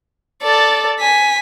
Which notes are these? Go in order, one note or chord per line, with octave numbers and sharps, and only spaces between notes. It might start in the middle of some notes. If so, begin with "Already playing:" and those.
A4 D5
G#5 B6